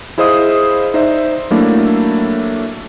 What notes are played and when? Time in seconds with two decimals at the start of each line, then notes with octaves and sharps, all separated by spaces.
0.18 E4 G#4 C5 D#5 F5 D#6
0.94 D#4 C5 D5 E5
1.51 F#3 A3 A#3 D4 E4